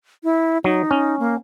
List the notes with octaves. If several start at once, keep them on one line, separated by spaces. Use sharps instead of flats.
E4
F#3 D#4
C#4
A#3